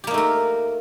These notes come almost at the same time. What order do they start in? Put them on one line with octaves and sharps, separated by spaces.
G4 A#3 D#4 A3 A#4